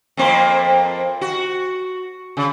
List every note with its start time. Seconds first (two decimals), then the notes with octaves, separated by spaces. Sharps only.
0.17 F2 A#3 C5
1.21 F#4
2.37 C#3